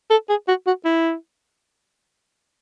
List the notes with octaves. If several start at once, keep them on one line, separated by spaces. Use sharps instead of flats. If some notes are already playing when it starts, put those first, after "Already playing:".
A4
G#4
F#4
F#4
E4